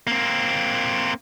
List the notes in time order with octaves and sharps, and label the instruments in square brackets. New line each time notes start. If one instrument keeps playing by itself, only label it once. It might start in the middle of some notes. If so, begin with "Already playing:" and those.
[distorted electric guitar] A#3 C4